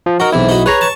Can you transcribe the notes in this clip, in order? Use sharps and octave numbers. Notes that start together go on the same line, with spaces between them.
F3
D#4 F#4 A#4
B1 E2 C3 E4
D#4 F#4
G#4 B4 C#5 A#5
A5 C#6